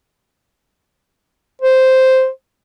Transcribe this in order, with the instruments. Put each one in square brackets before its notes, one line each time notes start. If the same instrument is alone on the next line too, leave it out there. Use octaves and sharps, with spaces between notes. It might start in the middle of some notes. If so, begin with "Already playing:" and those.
[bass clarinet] C5